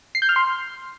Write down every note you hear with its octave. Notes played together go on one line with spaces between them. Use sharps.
C7
G6
F6
C6